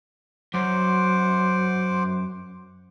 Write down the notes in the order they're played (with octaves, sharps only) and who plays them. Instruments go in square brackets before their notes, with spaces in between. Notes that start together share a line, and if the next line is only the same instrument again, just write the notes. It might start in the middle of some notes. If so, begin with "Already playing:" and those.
[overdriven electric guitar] F#2 [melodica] C5 F#5 D6